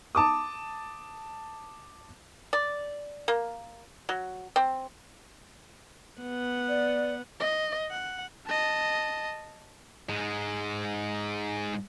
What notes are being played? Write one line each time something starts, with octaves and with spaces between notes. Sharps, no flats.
A5 D6 D#6
D5
A#3
F#3
C4
B3 F#5
D5
D#5
F#5
D#5 A5
G#2 G#3